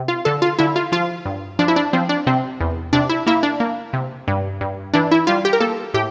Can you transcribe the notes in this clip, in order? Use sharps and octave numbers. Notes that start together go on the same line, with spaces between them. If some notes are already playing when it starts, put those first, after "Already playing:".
Already playing: C3
F4
D3 A4
F4
D3 E4
F4
F3 F4
G2
F3 D4
E4
D4
F3 C4
D4
C3 C4
E2
C3 D4
E4
A#3 E4
D4
A#3
C3
G2
G2
E3 D4
E4
G3 F4
G4
A#4
A#3 A4
A2 G4